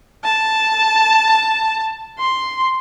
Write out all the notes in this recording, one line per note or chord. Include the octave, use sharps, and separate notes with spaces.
A5
C6